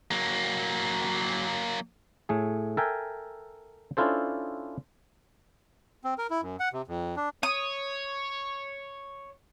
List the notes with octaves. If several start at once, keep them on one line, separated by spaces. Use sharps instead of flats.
F#3 A#3
A2 A3 G#4
A4 A#4 E5 G5 G#5
C#4 D4 E4 F4 A4 C5
C4
A#4
E4
F#2
F#5
C3
F2
D4
C#5 D#6